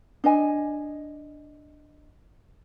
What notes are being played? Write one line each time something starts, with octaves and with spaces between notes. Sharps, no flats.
D4 D#5 G#5